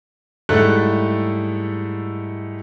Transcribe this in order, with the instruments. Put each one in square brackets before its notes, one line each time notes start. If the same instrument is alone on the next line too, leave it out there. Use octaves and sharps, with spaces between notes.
[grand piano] G#2 G3 A3 E4 A4 F#6